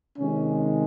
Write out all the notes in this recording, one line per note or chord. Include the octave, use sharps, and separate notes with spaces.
C3 D#3 G#3 C#4